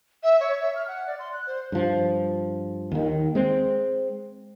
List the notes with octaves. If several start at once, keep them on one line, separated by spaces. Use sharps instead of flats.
E5
C#5
E5
F6
F#5
D5
C6
F#6
C5
G2 F3
D#2 D#3
G#3 C4